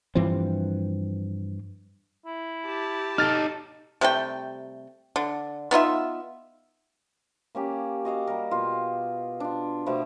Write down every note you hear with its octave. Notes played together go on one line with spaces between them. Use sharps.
G2 E3 F3 C4
E4
G4 A5
D#4 A4 F6 A6
C3 G3 A3 G5
D3
B3 D#4 F4 E5
A#3 C#4 G4
F#4 D#5 F5 D6
G3 A#4
B2 F4
D4 F4
B2 F3 A3 B3